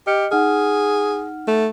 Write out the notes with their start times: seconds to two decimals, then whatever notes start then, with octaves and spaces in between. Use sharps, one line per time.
0.07 G4 D#5 F6 C#7
0.31 D#4 G#4 F#5 F6
1.48 A3